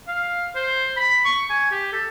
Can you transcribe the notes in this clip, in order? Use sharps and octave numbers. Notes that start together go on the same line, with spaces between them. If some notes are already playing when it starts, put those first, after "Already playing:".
F5
C5
B5
C#6
G#5
G4
A4